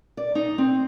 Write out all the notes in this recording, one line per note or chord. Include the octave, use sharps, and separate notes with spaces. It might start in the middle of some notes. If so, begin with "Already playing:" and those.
D5
D#4
C4